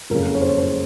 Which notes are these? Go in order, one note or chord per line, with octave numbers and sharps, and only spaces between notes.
F#1 F2 C#3 A#4
C#5
C5
C#5
C5